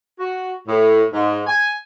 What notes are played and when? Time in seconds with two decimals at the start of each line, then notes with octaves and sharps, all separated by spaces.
0.20 F#4
0.68 A2
1.13 G#2
1.47 G#5